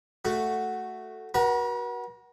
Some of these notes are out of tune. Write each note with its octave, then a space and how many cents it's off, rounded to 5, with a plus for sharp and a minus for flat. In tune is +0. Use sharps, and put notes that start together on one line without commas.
A3 +0 F#4 +0
F#4 +15 B4 -45 A#5 +0